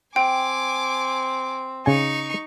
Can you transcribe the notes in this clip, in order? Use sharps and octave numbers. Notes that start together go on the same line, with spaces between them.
C4 G5 G#5 D6
C#3 D#4 G#5 C#6